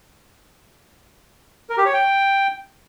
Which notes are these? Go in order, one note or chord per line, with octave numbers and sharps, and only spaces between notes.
A#4
G4
C#5
G5